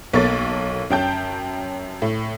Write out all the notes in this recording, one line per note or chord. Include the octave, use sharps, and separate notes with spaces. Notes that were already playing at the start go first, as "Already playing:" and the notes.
B1 A#3 A4 C#5 A6
F#2 C#4 G5 A5 G6
A2